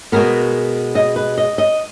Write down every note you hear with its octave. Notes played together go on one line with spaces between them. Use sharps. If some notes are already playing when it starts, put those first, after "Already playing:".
B2 G#3 B3 A#4
D#5
B4
D#5
D#5